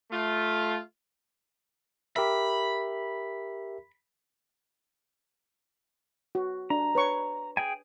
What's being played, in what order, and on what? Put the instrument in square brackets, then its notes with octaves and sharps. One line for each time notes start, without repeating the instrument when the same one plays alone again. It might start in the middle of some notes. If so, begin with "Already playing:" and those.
[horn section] A3 F4
[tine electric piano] G4 A#4 E5 [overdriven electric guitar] B5
[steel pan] F#4
[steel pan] D4 [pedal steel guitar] A#5
[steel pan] B4 C#5 C#6
[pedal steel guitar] G#4 G5 G#5